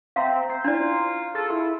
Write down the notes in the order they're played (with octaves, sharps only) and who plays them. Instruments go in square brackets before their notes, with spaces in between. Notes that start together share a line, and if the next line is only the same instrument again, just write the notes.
[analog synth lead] C4 [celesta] E5 A#5 [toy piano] F5
[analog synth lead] C5
[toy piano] D4 D5 [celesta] E4 A#5 C6 [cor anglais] F4
[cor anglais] F4 [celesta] G#4 [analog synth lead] A4
[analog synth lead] E4